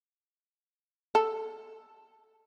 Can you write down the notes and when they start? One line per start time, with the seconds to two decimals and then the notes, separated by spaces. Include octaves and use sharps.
1.15 A4